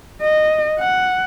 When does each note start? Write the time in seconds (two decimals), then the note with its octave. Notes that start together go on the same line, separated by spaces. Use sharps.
0.22 D#5
0.80 F#5